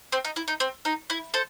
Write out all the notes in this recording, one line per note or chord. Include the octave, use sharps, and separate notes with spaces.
C4
D#4
E4
D#4
C4
D#4
E4
A4 C5